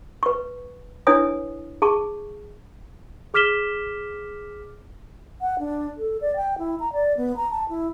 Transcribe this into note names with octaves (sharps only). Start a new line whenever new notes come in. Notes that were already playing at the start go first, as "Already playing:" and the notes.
B4 C#6
D4 E4 B4 C#5 G#5 D#6
G#4 A5 C#6
G#4 D6 F6 B6 E7 G7
F#5
D4
A4
D5
G5
E4
A#5
D5
B3
A#5
A5
E4